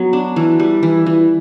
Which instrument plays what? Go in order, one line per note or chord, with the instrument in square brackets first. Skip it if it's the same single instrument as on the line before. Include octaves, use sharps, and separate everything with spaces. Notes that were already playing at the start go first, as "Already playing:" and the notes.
Already playing: [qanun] F#3 B3
D4
E3
G3
E3
E3